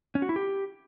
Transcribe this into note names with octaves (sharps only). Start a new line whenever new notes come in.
C#4
F#4
E4
G4